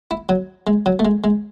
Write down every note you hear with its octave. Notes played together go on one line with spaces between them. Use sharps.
E4
F#3
G#3
F#3
A3
G#3
G#3